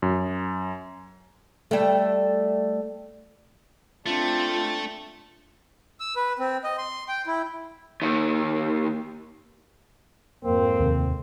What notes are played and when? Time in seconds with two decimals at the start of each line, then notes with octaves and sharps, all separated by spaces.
0.02 F#2
1.71 G3 A3
4.06 A3 C4 D4 F4
6.00 E6
6.16 B4
6.39 C4
6.64 D#5
6.78 C6
7.09 G5
7.27 E4
8.02 D#2 D#3
10.45 F2 G#2 A#3 C4
10.79 D#2 C3